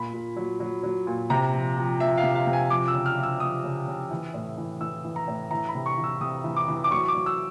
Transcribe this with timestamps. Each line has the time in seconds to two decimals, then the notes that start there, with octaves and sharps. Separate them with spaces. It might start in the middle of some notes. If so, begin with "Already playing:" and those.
Already playing: A#2 B5
0.13 A#2
0.36 F#3
0.60 F#3
0.83 F#3
1.07 A#2
1.30 C3 A#5
1.53 F3
1.77 F3
2.00 F3 E5
2.17 F5
2.23 C3
2.35 F5
2.47 C3
2.53 G#5
2.70 F3 D6
2.88 E6
2.94 C#3
3.06 F6
3.17 F3
3.23 E6
3.40 F3 D#6
3.64 C#3
3.87 C#3
4.11 E3
4.34 A2
4.58 E3
4.81 E3 E6
5.04 E3
5.16 A#5
5.28 A2
5.51 E3 A#5
5.68 B5
5.75 C3
5.86 C#6
5.98 E3
6.04 E6
6.21 C3 D#6
6.44 E3
6.56 D6
6.68 E3
6.84 D6
6.91 F#3 C#6
7.08 D6
7.15 F#3
7.26 E6